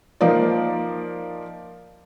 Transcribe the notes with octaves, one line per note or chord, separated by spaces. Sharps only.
F3 A#3 D#4 F4 D5